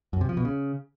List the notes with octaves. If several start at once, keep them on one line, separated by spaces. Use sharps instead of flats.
F#2
C3
F3
B2
C#3